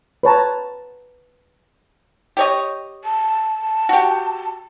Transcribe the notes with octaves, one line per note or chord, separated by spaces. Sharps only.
B4 C#5 A5 A#5
G4 C#5 D#5
A5
F#4 G4